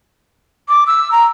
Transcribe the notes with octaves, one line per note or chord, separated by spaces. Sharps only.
D6
E6
A#5